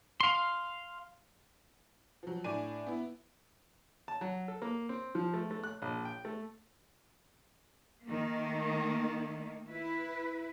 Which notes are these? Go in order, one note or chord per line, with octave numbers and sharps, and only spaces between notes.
F5 C6
F3 F#3
A2 D4 D5 G#5 D#7
B3 E4
A5
F#3
A4
A#3
C4
F3
A3
A3
F#6
A#1
G5
A3
D#3 A3 A#3
E4 B4